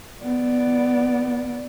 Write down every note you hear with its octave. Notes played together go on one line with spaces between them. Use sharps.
B3 D5